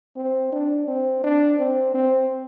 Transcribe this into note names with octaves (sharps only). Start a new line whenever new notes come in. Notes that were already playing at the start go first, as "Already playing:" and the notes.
C4
D4
C4
D4
C4
C4